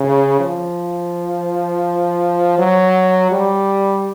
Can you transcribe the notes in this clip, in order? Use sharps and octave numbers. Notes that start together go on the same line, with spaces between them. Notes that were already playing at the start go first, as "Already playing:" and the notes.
Already playing: C#3
F3
F#3
G3